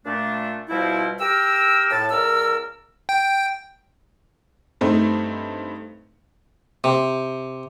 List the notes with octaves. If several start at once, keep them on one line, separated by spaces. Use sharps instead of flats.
A#2 A3 D4
B2 F3 G3 C4 E4
G4 A#4 E6
A2 A5
C#2 A#4 D5 E6
G5
G2 A3 C4 D#4
C3